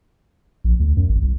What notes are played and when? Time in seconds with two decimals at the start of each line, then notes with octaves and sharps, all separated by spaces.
0.64 A#1
0.80 D2
0.97 F#2
1.09 G#1
1.22 C2